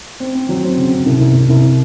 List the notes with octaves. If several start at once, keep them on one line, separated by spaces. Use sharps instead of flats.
C4
C4
F#3
C4
C#3
C#3
C2
C2
C2
C2